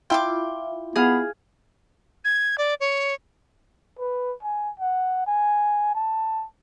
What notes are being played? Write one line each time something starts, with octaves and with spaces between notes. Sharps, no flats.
E4 F4 G5 C6 D6
B3 G#4 F5
G#6
D5
C#5
B4
G#5
F#5
G#5
A5